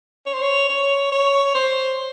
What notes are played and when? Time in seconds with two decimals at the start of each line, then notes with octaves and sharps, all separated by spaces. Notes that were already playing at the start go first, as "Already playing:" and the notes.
0.26 C#5
0.33 C5
0.42 C#5
0.69 C#5
1.12 C#5
1.55 C5